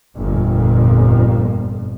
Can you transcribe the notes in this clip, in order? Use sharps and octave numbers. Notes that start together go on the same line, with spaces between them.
G1 F2 A#2